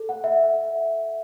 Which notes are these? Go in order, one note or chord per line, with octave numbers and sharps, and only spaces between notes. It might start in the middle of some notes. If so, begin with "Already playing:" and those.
Already playing: A4
F#5
E5